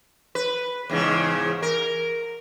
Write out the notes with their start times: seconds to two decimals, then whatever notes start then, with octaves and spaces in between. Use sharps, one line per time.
0.35 B4
0.90 E2 G#2 C#3
1.62 A#4